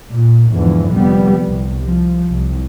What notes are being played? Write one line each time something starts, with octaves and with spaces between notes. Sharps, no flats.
A#2
E2 G#2 D3 E3 F3
F1 F2 G3 B3
C2
F3
C2